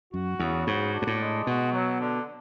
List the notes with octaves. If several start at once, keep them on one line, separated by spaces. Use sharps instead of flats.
F#2 F#4
E2 C#3
G#2 F#4
D4
G#2
A2
G#3
B2 F#4
F#3
D3